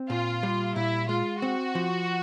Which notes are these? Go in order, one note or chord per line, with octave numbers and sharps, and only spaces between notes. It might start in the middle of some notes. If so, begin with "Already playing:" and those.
Already playing: C4
A#2 F4
G3
A#2 E4
G#3 F4
C4 F#4
F3